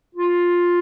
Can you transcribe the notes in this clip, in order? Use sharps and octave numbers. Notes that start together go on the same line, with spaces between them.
F4